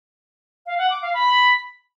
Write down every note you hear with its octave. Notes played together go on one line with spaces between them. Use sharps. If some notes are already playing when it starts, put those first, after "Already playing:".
F5
F#5
D6
F5
B5